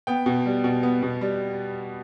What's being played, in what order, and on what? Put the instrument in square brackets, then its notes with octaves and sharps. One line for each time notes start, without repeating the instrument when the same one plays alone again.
[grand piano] B3 G5
B2
G3
B2
B3
B2
G3